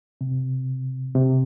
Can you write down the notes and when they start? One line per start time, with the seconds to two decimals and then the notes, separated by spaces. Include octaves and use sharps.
0.21 C3
1.15 C3